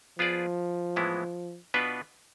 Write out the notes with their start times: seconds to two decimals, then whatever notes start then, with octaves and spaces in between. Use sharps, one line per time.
0.19 F3 B3 F4 G#4 D5
0.96 A2 E3 G#3 B3 E4
1.74 B2 B3 D4 F4 B4